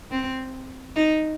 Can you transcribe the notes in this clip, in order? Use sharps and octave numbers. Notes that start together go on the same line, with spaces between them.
C4
D#4